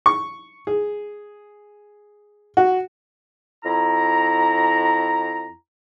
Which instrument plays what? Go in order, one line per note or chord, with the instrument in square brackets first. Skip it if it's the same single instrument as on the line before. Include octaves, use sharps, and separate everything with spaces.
[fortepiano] C#6
G#4
F#4
[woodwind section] F2 E4 A#5